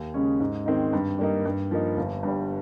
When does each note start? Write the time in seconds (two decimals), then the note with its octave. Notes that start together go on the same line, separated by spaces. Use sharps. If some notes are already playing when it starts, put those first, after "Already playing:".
Already playing: D#2
0.14 C#3 G#3 C#4
0.40 G#2
0.66 D#3 G#3 C4 D#4
0.93 G2
1.18 G3 A#3 D#4
1.45 G2
1.71 F3 A#3 D#4
1.97 G1
2.23 G2 G3